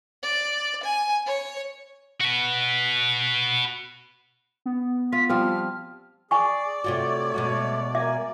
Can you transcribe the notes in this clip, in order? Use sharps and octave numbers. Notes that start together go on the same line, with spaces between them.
D5
G#5
C#5
F#4 B4
B3
F4 B6
F3 G3 C4 F6
G#4 D5 G#5 C#6
C3 A3 F4 F#4 C#5
B2 G#3 F#4
A#3 E5 G#5 D6